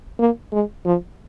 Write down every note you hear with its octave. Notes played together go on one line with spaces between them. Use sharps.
A#3
G#3
F3